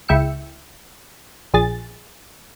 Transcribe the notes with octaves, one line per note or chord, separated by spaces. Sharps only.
C#2 E4 G5 E6 C#7
A#1 G#4 A6